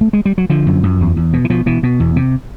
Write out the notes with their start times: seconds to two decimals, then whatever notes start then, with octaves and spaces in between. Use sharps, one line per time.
0.01 A3
0.13 G#3
0.25 G3
0.38 F#3
0.50 D3 F3
0.66 F#2
0.83 F#2
1.01 E2
1.17 E2
1.33 B2
1.45 E3
1.50 B2 F3
1.66 B2 E3
1.83 B2
2.00 E2
2.16 C3